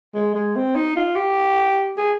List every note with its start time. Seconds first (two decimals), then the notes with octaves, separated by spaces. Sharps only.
0.15 G#3
0.35 G#3
0.56 C4
0.76 D#4
0.96 F4
1.16 G4
1.98 G#4